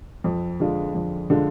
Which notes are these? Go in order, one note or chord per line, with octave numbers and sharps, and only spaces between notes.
F2
D3 G#3 D4 F4
F2
D3 G#3 D4 F4